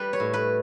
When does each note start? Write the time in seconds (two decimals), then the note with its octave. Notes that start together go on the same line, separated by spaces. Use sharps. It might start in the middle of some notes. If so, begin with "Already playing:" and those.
Already playing: G3 B4
0.13 C#5
0.20 A2
0.34 B4